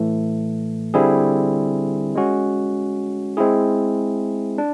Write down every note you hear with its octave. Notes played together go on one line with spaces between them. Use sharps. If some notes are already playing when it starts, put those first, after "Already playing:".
Already playing: A2 E3 A3
D3 G3 C4 E4 G#4
G#3 C#4 F#4
G#3 C4 E4 G#4
D4